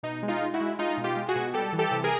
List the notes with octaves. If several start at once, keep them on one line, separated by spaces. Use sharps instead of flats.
B2 D#4
G#3
D#4 F4
G#3
E4 F#4
G#3
G#3 D#4 F4
B2
F4 G4
G#3
F#4 G#4
B2
G3 G4 A4
E3
G4 A4
C3
G#4 A#4